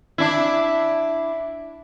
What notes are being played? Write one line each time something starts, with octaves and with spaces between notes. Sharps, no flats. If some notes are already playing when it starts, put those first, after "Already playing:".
D4 E4